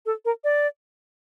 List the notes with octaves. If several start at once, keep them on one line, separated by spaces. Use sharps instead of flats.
A4
A#4
D5